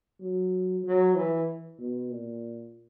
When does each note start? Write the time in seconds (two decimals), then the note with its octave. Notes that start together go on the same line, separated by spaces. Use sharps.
0.20 F#3
0.84 F#3
1.16 E3
1.79 B2
2.10 A#2